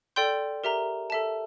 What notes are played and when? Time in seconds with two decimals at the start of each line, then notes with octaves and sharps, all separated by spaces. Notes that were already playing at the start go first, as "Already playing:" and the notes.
0.16 A4 D5 G5 C6 G6
0.64 G4 A#4 E5 A#5
1.10 A4 E5 A5